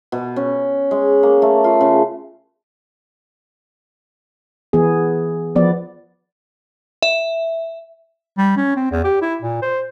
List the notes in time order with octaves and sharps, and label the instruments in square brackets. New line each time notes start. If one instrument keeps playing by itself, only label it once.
[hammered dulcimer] B2
C#4
G#3
A#3
A3
F4
C#3
[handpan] E3 B3 G#4
F3 B3 D5
[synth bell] E5
[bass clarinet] G3
C#4
C4
E2
G4
E4
A#2
C5